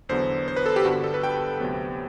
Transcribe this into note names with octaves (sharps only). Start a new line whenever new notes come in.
E2 D3 F#3 B3 C5
C5
B4
A4
G4
G2 D3 G3 B3 F#4
A4
B4
G5
D2 C3 F#3 B3